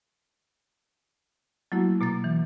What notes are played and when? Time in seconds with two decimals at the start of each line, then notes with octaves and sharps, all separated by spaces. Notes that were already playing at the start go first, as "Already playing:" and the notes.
1.72 F#3 A3 A#3 E4 F#4
2.01 B2 A#3 A6
2.24 E3